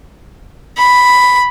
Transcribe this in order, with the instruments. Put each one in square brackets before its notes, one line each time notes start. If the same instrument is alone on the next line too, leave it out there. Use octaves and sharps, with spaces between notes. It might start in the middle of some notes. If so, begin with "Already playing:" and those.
[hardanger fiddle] B5